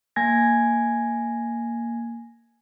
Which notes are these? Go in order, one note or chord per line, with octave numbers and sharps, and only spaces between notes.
A#3 G#5 G#6 A#6